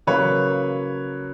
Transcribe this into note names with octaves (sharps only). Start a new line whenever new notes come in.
C#3 F#3 A#3 B4 C#5